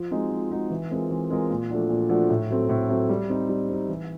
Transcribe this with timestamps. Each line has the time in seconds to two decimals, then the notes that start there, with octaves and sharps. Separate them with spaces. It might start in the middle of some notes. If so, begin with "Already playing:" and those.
Already playing: F3
0.11 G#3 C4 D#4 F#4
0.31 F3
0.50 G#3 C4 D#4 F#4
0.70 E3
0.90 G#3 C4 F4 A#4
1.10 E3
1.30 G#3 C4 F4 A#4
1.50 A#2
1.70 F3 A3 D4 F#4
1.89 A#2
2.09 F3 A3 D4 F#4
2.29 A2
2.50 F#3 A3 C4
2.69 A2
2.89 F#3 A3 C4
3.09 G3
3.29 C4 D#4
3.49 G3
3.69 C4 D#4
3.88 E3